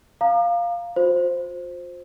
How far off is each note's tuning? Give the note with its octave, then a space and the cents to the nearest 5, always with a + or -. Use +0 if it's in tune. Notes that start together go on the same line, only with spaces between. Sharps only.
F5 +0 A#5 -10 D6 +45
F4 +40 C5 +0